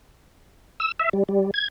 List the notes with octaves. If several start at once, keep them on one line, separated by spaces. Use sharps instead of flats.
E6
E5
G3
G3
G#6